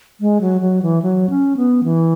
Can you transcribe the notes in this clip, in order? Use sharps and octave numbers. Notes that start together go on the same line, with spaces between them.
G#3
F#3
F#3
E3
F#3
C#4
B3
E3